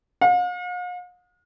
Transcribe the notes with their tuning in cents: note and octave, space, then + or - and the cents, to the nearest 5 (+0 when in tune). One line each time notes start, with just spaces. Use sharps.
F5 +45